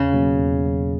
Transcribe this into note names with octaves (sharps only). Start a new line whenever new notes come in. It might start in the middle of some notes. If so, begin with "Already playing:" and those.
Already playing: E2 C#3
B2 F#3 A#3 C#4
E2
B2 F#3 A#3 C#4